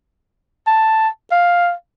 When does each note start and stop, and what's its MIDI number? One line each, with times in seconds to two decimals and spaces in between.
0.67 1.08 81
1.31 1.72 77